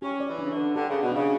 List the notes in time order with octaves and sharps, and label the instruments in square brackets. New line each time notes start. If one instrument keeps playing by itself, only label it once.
[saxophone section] C#4 [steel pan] G4
[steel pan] D5
[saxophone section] E3
[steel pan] D4
[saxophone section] C#3
D3
[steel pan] B4
[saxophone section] D3 [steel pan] G4
[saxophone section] C#3
[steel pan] D5
[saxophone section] B2
[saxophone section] C#3 [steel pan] D4